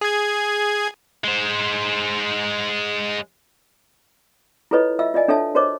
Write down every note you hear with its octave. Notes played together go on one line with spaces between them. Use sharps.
G#4 G#6
G#3 C5
E4 F4 A4 B4 C#5 D#5
F4 D#5 E5 E6
F4 D5 D#5 G#5
D4 A4 C#5 E5 A5
F#4 A#4 C5 C#5 D#5 D6